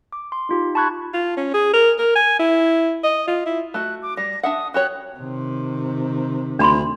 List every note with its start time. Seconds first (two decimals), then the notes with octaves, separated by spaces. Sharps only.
0.12 D6
0.32 C6
0.49 D#4 F4 G4
0.75 A5 B5 C#6 F#6 G#6
1.14 F4
1.37 C#4
1.54 G#4
1.73 A#4
1.98 A#4
2.15 G#5
2.39 E4
3.04 D#5
3.27 F4
3.46 E4
3.74 A3 F#4 F#6
4.03 D6
4.17 G3 A#6
4.43 D4 E5 F#5 D#6
4.74 F#4 G4 C#5 F#6
5.18 C3 D#3
6.59 D2 D4 B5 C6